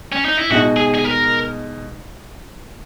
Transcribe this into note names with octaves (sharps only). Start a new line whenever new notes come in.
C#4
D#4
E4
B2 G#3 D#4 F#4
G#4
G#4
A#4